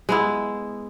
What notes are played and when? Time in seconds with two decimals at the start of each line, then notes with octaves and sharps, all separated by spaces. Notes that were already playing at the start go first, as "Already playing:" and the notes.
0.09 G#3 B3 E4